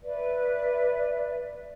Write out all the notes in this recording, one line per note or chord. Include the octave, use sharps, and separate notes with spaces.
B4 D5 E5